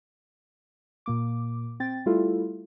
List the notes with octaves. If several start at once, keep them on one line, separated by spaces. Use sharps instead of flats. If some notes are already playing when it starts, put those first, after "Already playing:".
A#2 A#3 D6
C4 G5 A6
G3 A3 E4 F4 A4